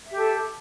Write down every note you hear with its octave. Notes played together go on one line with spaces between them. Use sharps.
G4 A4 E5